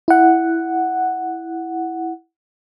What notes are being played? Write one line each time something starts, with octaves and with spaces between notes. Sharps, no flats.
E4 F#5